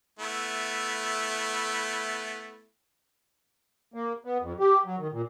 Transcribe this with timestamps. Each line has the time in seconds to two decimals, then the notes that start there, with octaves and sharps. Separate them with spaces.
0.19 A3 B3 E4
3.94 A#3
4.25 B3
4.41 F2
4.60 G4
4.85 F#3
4.99 D#3
5.12 A#2